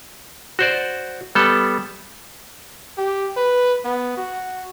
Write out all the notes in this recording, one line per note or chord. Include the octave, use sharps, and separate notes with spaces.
F#4 C5 D5
G3 B3 A4
G4
B4
B3
F#4